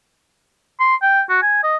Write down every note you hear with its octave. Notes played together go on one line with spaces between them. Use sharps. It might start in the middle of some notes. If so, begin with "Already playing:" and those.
C6
G5
F#4
G#5
D#5